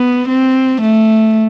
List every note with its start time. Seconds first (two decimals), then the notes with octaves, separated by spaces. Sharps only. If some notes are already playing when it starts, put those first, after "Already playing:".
Already playing: B3
0.29 C4
0.82 A3